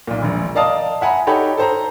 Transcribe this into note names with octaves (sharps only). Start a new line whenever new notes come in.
B1 A#2
E1 A#1
A#4 D5 D#5 F5 A5 D#6
E5 F#5 G#5 A#5 B5
D#4 F#4 G4 A4 C#5 B5
A4 C5 A#5